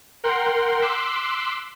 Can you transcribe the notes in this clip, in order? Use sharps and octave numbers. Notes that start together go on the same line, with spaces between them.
A#4 F#5 G5 C6
C6 D6 E6 F#6 B6